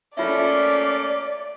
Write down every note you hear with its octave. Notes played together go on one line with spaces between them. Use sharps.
A3 A#3 C#4 F4 D5 E5